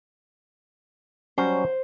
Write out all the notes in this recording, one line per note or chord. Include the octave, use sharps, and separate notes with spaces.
F#3 G3 C#4 C5